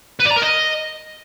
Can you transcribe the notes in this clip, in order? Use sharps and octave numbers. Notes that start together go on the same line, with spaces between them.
B4
D5
A#5
A#4
D#5